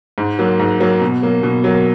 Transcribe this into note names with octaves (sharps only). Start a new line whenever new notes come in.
G#2
F#3 A#3
G#2
F#3 A#3
B2
F#3 A#3
B2
F#3 A#3